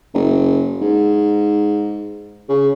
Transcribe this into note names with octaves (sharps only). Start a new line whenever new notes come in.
F#1
G#2
C#3